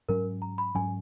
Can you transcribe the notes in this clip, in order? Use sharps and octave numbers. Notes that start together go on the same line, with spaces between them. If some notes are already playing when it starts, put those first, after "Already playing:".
G#2 F#3 C#4 A#4
A#5
B5
G#2 F#3 C#4 G#5